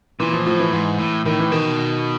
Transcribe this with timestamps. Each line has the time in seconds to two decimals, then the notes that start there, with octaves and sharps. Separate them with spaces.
0.20 A#2 E3
0.33 F3
0.46 A2 F3
0.59 E3
0.73 G#2
0.98 A2
1.25 A2 D#3
1.39 E3
1.51 B2 D#3